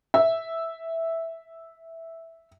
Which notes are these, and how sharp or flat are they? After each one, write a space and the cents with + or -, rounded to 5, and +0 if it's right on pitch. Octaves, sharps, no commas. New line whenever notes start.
E5 -5